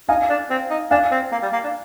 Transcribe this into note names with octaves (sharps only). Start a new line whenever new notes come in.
D#4 F5 G#5
D4
C4
D#4
D4 F5 G#5
C4
A#3
G3
A#3
D4